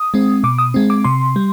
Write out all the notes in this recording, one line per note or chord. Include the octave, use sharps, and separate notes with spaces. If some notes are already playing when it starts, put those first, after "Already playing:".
Already playing: D#6
G#3 C4
B2 D6
D#6
G#3 C4
D6
C3 C6
G3